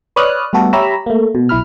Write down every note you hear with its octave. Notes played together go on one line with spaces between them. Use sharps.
B4 C#5 D5 D#6 F6 F#6
G3 A3 B3 F#4 A4
G4 C#5 E5 A#5 B5 E6
A3 A#3
B2
B1 E4 B5 F6